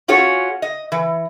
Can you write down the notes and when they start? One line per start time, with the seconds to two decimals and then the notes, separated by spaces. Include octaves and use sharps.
0.08 C#4 F4 F#4 G#4 C#5
0.62 D#5
0.92 E3